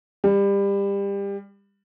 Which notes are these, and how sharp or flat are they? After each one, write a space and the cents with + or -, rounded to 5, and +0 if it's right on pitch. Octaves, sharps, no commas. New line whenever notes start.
G3 +25